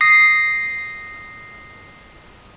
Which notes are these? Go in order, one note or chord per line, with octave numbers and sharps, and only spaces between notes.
D#6 A#6 C7